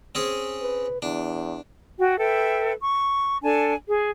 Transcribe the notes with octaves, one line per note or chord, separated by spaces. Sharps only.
C4 C#4 G#4
B4
E2 D4
F#4 G5
A4 B4 E5 G5
C#6
D4 A4 G#5 A5
G#4